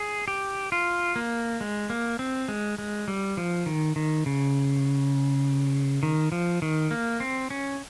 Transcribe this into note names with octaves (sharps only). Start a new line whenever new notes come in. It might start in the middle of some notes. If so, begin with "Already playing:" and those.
Already playing: G#4
G4
F4
A#3
G#3
A#3
C4
G#3
G#3
G3
F3
D#3
D#3
C#3
D#3
F3
D#3
A#3
C4
C#4